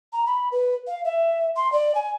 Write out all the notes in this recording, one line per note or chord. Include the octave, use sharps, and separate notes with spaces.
A#5
B5
B4
F5
E5
C6
D5
G#5